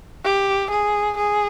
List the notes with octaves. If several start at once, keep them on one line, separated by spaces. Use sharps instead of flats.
G4
G#4
G#4